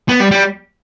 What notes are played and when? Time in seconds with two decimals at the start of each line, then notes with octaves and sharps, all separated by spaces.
0.09 B3
0.20 G3
0.31 G3